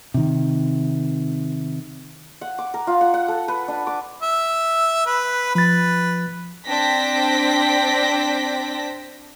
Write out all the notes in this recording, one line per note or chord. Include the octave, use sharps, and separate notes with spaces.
C3 D#3
F#5
D6
A#4
F4
F#5
F#5
A4
B4
D4
D6
E5
B4
F3 B4 A6
C4 D4 G5 A#6 B6